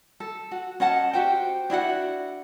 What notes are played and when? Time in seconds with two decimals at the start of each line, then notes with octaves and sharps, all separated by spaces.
0.20 A4
0.51 F#4
0.80 C#4 D#5 F#5 A5
1.13 F#4 G4 C5 G5
1.70 D4 E4 F#4 F#5